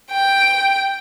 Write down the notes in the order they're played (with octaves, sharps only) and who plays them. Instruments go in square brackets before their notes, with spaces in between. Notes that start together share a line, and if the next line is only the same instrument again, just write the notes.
[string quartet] G5